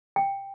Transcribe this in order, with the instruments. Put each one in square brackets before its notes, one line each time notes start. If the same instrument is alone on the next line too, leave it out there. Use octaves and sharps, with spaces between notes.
[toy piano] G5